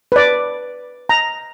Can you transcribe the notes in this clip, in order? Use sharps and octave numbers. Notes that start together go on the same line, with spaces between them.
B4 D5
A#5